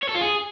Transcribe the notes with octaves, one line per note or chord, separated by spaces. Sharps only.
C#5
A4
F4
G#4